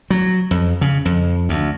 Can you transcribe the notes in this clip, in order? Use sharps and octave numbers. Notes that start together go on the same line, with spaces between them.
F#3
F2
C#3
F2
D2